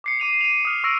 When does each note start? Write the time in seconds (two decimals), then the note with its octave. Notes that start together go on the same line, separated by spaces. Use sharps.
0.04 D6 C7 C#7
0.20 D6 D#7 F7
0.41 D#7 F7
0.65 D#6 F6
0.84 C#6 E6 A#6 C#7 D7